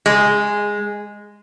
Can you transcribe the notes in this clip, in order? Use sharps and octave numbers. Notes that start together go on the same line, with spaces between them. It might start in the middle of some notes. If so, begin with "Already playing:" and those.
G#3